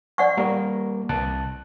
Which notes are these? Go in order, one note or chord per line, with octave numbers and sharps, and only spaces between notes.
D5 F#5 C#6
G3 A#3 A#4
C2 A5 F#6